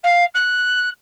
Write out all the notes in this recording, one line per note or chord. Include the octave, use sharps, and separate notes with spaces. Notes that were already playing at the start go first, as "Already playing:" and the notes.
F5
F#6